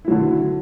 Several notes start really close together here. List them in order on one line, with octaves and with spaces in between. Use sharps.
E4 F#3 D3